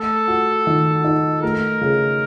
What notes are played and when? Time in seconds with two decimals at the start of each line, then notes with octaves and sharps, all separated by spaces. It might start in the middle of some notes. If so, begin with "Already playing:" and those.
Already playing: A3 A4
0.28 F#4
0.67 D#3
1.04 D#4
1.43 A3 A#4
1.81 C#3